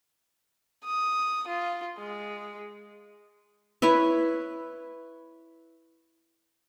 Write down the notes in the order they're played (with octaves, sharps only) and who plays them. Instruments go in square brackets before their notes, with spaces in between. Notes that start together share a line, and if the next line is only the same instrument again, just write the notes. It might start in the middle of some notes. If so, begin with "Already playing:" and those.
[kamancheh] D#6
F4
G#3
[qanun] E4 B4 C#5 E5